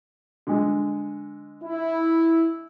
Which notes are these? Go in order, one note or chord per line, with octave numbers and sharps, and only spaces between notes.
D3 G#3
E4